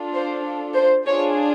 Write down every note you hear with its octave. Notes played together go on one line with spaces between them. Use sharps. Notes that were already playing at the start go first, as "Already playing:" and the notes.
Already playing: D4 F4 A4
C5
C5
D4 F4 G#4 C#5